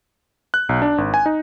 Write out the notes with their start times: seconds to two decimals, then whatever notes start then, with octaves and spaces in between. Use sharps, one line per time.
0.54 F#6
0.69 B1
0.82 D4
0.98 G#1
1.14 G#5
1.26 D#4